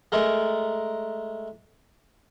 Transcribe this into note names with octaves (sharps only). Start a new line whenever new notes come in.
G#3 A3 A#4